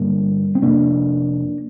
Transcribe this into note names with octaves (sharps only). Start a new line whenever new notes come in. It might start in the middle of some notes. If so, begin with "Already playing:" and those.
Already playing: G2 D3 G3 A#3
C4
F2 C3 A#3 D4